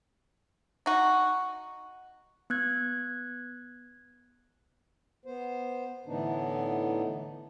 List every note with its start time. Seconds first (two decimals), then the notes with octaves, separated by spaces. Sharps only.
0.86 D#4 F#4
2.50 B3 F#6 G#6
5.26 B3 C5
6.06 A2 D3 E3 B3 D4 D#4